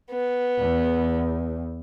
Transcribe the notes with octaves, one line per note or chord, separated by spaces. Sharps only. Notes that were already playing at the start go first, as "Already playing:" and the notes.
B3
E2